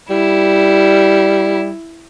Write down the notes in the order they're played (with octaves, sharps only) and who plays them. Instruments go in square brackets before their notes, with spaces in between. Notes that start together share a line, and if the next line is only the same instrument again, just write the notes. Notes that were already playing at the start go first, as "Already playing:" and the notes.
[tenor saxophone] G3 [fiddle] E4